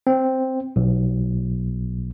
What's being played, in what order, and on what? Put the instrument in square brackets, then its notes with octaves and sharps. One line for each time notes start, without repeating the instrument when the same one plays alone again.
[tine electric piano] C4
B1